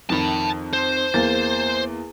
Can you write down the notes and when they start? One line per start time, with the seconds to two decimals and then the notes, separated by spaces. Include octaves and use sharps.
0.10 F2 D#3 A5 B5
0.73 C5
1.14 E2 A#3 A6